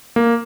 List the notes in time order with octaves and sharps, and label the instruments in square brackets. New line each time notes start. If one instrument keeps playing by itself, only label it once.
[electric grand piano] A#3